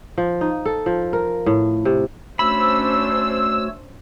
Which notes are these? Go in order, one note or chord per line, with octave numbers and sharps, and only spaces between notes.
F3
D#4
A4
F3
A#4
A2
C3
A3 C#4 D4 F#4 C5 C#5 B5 E6